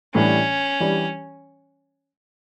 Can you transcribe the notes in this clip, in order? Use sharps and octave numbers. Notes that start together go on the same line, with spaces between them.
A2 E3 G3 C#4 D4
E3 G3 D4 G4